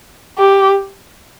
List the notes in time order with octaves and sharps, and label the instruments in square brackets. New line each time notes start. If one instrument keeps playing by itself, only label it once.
[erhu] G4